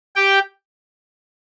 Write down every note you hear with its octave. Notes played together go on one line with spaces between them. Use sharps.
G4 G5